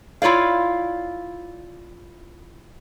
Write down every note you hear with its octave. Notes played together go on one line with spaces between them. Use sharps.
E4 F4 C#5 D5 F5